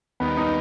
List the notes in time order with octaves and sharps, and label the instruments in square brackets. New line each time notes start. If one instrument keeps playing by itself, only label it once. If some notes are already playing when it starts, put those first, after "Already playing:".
[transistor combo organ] D#2 D#3 G3 [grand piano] B3
[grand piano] D#4